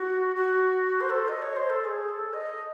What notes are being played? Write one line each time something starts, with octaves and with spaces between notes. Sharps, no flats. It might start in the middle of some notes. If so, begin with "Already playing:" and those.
Already playing: F#4
F#4
C5
A4
D#5
C#5
C5
A4
G#4
A4
D#5